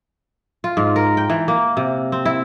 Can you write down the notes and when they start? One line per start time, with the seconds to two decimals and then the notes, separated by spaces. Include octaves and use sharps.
0.64 F4
0.77 G#2
0.96 A#4
1.17 G5
1.30 E3
1.48 A#3
1.77 C3
2.12 C4
2.25 E4